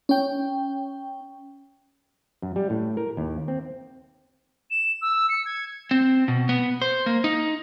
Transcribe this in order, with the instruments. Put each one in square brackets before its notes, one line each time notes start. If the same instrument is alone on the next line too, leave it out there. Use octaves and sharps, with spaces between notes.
[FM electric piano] C#4 G5
[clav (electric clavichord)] F#2
G3
A2
A#4
D#2
C4
[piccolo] E7
E6
C#7
G#6
[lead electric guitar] C4
B2
B3
C5
A#3
D#4